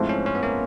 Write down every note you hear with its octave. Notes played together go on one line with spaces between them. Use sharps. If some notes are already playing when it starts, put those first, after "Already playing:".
Already playing: G#2 F3 A3 C4 E4
C#4
C#4
B3
A#3